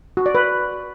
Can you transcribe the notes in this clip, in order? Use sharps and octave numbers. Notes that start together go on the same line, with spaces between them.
F#4
D5
B4